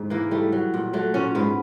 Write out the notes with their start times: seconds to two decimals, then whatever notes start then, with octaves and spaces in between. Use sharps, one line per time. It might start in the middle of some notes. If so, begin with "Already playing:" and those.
Already playing: G#2
0.10 E3 A#3
0.31 G3 A3
0.52 F#3
0.74 A#2
0.93 F#3 A3
1.14 A#2 C#4
1.35 G#2 B3